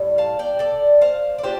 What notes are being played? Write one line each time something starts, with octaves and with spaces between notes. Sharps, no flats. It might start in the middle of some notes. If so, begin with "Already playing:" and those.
Already playing: A2 G3
F5 A5
D5 G5
A4 D5
C5 F5
D5
D4 F4 G4 C5